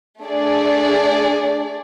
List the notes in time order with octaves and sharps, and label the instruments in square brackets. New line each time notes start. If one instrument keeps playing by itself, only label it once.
[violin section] A3 D4 G#4 D5